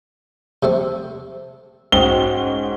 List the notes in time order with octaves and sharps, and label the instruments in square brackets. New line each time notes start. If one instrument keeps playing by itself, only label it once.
[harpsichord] C3 A3 C4
[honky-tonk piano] G#2 C#4 F#4 [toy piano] C5 G5 D#6 [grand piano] G7